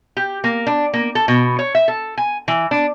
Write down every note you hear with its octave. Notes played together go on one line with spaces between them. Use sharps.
G4
A#3
D4
A#3
A4
B2
C#5
E5
A4
G#5
E3
D4